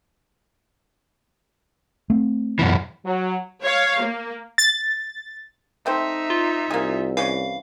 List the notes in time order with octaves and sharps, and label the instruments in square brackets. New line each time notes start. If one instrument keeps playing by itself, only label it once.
[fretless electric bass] A3 C4
[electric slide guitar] F#2 B2 E3
[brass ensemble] F#3
[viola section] C#5 F5
A#3
[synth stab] A6
[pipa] A3 C4 C5 [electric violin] D#4 E5
[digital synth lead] F4
[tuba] C2 [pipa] A#3 G#4
[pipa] E3 C#4 [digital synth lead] F5